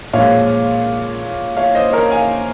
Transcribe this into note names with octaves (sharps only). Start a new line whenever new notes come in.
A#2 F3 G#3 C#5 F5
C#5 F5
C5 D#5
A#4 C#5
F5 G#5